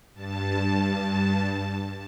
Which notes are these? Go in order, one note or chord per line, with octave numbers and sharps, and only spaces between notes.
G2 A5